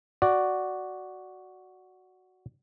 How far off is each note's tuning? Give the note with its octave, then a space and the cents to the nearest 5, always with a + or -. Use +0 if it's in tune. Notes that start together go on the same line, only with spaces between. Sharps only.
F#4 +0 D5 +0